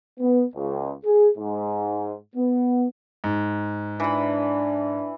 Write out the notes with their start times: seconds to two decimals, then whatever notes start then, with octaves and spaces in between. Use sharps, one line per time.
0.19 B3
0.55 C#2
1.05 G#4
1.38 G#2
2.36 B3
3.24 G#2
4.00 E3 D4 B5